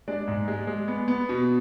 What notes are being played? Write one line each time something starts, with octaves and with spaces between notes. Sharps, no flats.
G#3 D4 D5
G#2
G#3
G#3
B3
B3
B2